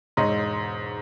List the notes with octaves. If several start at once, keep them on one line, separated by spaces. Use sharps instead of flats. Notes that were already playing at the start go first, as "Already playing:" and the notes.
E1 G#2 C#5 D#5 A#5 C6